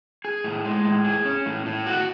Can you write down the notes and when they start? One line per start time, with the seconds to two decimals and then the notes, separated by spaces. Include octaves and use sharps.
0.25 G#4
0.44 A2
0.65 G#3
0.85 A2
1.05 G#4
1.25 C#4
1.46 A2
1.66 A2
1.86 F#4